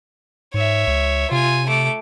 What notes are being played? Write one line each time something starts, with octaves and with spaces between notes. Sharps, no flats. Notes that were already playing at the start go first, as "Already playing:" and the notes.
G#2 C#5 E5
C#2
C3 F4 G#5
A3 D6